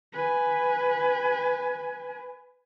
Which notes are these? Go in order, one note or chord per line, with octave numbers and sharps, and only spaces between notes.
B4 G#5